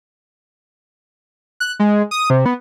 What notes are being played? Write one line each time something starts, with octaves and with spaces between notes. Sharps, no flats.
F#6
G#3
D#6
C3
B3